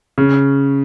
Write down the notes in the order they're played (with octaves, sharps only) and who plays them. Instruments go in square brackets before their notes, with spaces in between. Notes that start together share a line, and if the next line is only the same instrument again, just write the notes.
[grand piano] C#3